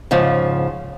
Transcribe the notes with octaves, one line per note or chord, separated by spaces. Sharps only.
G#2 C#3 F3